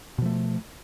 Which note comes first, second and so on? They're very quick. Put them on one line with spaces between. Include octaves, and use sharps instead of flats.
B2 F3 A3